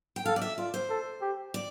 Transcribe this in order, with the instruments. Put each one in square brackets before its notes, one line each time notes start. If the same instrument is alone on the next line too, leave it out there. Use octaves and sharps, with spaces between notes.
[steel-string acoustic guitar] G5
[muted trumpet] A4 [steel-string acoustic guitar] F5
[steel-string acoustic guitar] D5
E5
[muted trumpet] F4 [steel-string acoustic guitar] D5
[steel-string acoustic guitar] C5
[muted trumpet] A4
G4
[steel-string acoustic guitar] D5